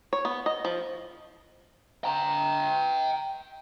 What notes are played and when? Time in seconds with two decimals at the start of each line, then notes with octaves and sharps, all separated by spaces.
0.13 C#5
0.25 B3
0.46 D#5
0.65 F3
2.04 G5 A#5